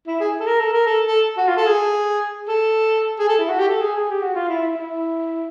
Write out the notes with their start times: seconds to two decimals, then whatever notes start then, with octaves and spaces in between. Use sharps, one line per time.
0.07 E4
0.20 G#4
0.40 A4
0.47 A#4
0.60 A4
0.73 A#4
0.87 A4
1.07 A4
1.38 F#4
1.48 F4
1.57 A4
1.67 G#4
2.48 A4
3.19 G#4
3.28 A4
3.38 E4
3.49 F#4
3.58 G4
3.68 A4
3.81 G#4
3.96 G#4
4.09 G4
4.22 F#4
4.35 F4
4.48 E4
4.62 E4
4.76 E4